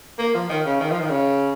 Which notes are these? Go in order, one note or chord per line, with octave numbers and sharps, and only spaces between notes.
A#3
F3
D#3
C#3
D#3
F3
D#3
C#3